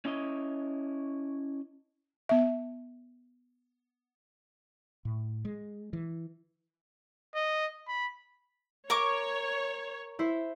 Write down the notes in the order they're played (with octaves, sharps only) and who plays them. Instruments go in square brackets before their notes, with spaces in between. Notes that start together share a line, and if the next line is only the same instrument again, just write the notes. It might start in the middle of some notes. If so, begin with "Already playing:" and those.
[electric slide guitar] C#4 E4 C#5 D#5
[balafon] B3 E5
[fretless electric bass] A2
G#3
E3
[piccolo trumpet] D#5
B5
[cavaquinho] A#4 C#6 D6 [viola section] C#5
[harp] E4 C5 E5